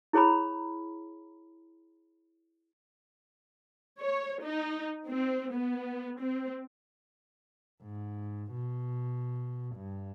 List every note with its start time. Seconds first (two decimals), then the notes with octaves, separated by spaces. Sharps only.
0.13 E4 G#4 C#5 A#5 B5
4.01 C#5
4.44 D#4
5.08 C4
5.52 B3
6.21 C4
7.83 G#2
8.52 B2
9.76 G2